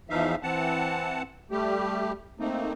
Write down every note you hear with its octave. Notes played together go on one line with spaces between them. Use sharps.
E2 E3 F3 D#4 E5 F5
E3 C4 F#5 A5
G3 A3 G4
A3 A#3 C4 D#4